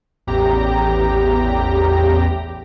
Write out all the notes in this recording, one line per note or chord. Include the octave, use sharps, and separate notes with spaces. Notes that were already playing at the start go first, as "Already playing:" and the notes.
A1 E2 G4 A#5